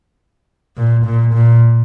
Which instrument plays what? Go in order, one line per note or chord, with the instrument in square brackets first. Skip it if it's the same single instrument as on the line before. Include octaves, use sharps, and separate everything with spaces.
[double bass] A#2
A#2
A#2